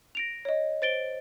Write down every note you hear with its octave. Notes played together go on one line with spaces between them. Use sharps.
A#6 D7 F7
C#5 D#5
C5 A6 D7 G7